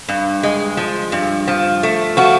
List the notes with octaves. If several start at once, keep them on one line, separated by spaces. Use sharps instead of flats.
G2
G#3
F3
G2
F3
A3
F3 F#4